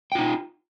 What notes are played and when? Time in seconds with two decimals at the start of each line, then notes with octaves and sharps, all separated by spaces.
0.12 G5
0.15 F4
0.19 D#4